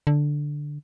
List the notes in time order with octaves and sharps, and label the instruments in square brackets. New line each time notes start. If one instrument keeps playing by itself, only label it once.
[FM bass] D3